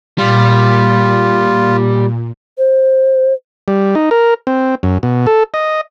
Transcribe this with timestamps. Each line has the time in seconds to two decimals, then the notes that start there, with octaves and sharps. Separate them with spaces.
0.18 A#2 G3 F4
2.58 C5
3.68 G3
3.95 D#4
4.11 A#4
4.47 C4
4.83 F#2
5.03 B2
5.26 A4
5.54 D#5